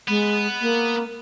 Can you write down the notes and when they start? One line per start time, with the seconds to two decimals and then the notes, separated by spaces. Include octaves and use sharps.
0.08 G#3 B3
0.61 A#3